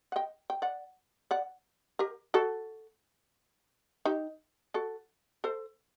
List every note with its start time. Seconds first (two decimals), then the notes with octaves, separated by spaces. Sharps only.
0.12 F#5
0.16 D#5 G5
0.50 G5
0.62 D5 F#5
1.31 D5 F#5
1.99 G4 A#4
2.34 F#4 A4
4.05 D#4 G4
4.74 F#4 A4
5.44 A4 C5